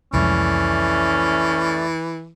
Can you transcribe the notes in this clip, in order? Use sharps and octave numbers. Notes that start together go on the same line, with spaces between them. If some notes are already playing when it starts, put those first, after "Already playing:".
C2 F2 E3 G#3 A3 C#4 D5